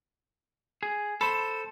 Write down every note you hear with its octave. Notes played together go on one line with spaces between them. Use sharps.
G#4
A4 C5 B5